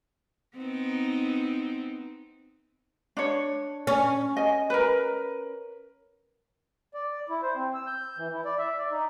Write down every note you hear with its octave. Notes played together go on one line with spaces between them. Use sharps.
B3 C4 D#4
D4 C#5
C#4
D#5 G#5
A#4 B4
D5
E4
C5
C4
E6
G6
E3
E4
D5
E5
D5
D#4